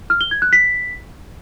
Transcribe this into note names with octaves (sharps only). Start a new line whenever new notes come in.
F6
G7
G#6
F#6
B6